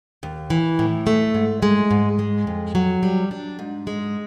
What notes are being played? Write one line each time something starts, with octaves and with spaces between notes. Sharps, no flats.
D#2
E3
A2
A3
G#2
G#3
G#2
G#3
F2
F#3
G3
D4
G#2
G#3